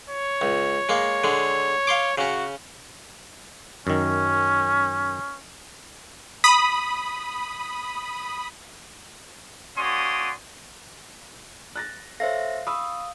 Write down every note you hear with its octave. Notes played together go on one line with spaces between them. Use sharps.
C#5
C#2
G#3 A#3
D3 G#3
F5 C6 D6
C#3 C#4 F#4
F#2 D#3 C#4
B5 D#6
A#3 C#4 F#4 D5 C6 D#6
F#6 A6 A#6
A4 C5 C#5 E5 F5 A#6
B5 C#6 D#6 E6